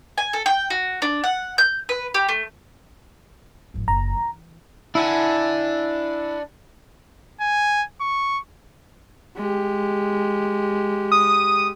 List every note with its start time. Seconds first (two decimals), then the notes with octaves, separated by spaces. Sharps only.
0.18 G#5
0.33 A4
0.46 G5
0.70 F#4
1.02 D4
1.24 F#5
1.58 G6
1.89 B4
2.14 G4
2.29 A3
3.74 G#1 F3
3.88 F#1 A#5
4.17 E3
4.95 D4 E4 F#5 G#5
7.41 G#5
8.00 C#6
9.36 G#3 G4
11.12 D#6